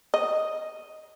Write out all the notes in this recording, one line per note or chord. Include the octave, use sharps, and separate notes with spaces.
D#5